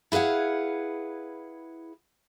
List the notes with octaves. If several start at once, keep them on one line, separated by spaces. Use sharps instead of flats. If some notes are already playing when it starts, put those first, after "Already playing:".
E4 G#4 B4 F5 F#5